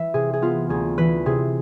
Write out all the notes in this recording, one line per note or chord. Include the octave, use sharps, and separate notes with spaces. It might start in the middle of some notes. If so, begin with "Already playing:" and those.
Already playing: E3 E5
C3 G#4
G#4
B3 F4
D2 G#4
E3 B4
C3 G#4